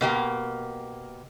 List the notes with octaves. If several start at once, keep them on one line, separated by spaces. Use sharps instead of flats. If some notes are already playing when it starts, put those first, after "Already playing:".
B2 A#3 G4